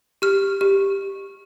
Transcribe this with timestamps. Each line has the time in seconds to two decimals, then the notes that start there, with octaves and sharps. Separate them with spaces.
0.22 G4 F6
0.61 G4